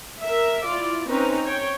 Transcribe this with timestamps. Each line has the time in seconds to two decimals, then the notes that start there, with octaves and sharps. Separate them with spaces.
0.23 A#4 E5
0.65 E4 F4 D5
1.09 C4 C#4 D#4 B4 A#5
1.45 C#5 G5